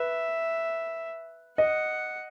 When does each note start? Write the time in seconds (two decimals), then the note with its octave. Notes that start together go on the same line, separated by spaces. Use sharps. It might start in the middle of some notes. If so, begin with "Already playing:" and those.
Already playing: B4 E5
1.58 D#5 F#5